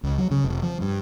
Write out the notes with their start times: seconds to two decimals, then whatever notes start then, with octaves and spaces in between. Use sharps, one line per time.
0.03 C#2
0.18 F#3
0.31 C#3
0.44 F1
0.63 F3
0.81 G2